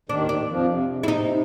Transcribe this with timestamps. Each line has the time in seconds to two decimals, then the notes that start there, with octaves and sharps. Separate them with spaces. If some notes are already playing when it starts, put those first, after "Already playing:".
0.09 D#2 D#3 D4
0.29 D4
0.48 F2 F3
0.68 C3
0.88 C3
0.97 C#3
1.03 E4
1.06 C3 D#4